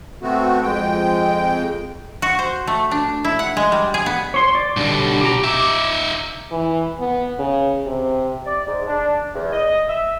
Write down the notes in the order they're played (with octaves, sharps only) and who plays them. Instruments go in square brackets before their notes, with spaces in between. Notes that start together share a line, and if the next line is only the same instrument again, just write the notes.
[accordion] A3 B3 C4 F#4
F2 G#3 G5
[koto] F#4
C5
A3
D4
E4
F#5
G#3
G3
G#4
B3
[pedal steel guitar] C#5 C6
D5
[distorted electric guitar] B1 B2 [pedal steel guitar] D3 G3
[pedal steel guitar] G4 A#5
[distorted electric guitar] D#4 E5 [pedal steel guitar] D6
[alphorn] E3
B3
C#3
C3
[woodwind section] D5
G#2
D4
E2
D#5
E5